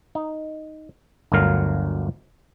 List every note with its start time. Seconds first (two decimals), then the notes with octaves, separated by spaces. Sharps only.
0.15 D#4
1.32 G1 D2 F#3 A#4 F5